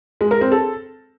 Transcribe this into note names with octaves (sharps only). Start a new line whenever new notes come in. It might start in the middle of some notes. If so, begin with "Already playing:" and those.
G#3
A#4
C4
A4